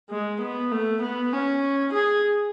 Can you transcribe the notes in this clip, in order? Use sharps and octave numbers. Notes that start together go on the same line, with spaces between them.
G#3
B3
A3
B3
C#4
G#4